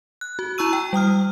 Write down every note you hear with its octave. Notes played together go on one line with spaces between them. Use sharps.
F#6
F#4
E4 A#5 C#6 E6 D#7
G5
G3 G5 D#6 F6